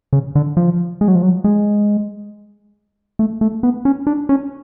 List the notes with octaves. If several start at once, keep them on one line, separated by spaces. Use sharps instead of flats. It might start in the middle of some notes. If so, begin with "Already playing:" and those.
C#3
D3
F3
G#3
F#3
F3
F#3
G#3
A3
A3
B3
C#4
D4
C#4